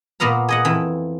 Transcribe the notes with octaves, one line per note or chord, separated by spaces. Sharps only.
A#2 A#3 B3 F5 A#5
G#4 D#5 F#5
F2 E3